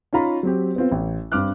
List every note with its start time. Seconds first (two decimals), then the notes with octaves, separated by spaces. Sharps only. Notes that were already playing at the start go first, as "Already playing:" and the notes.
0.13 C#4 D#4 F4 A#5 B5
0.43 F#3 C4 G4
0.76 B3 C4 F4
0.92 A1
1.32 G2 C4 D6 F6 F#6